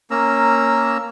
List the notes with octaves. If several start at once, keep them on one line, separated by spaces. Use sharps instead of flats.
A#3 C#4 A#5 E6